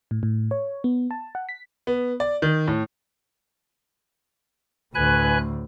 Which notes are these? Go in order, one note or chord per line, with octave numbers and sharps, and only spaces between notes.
A2
A2
C#5
B3
A5
F#5
B6
B3
D5
D#3
A2
D2 A2 B4 G#5 F#6